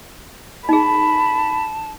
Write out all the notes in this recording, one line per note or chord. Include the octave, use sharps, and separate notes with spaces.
D#4 G#4 A5 B5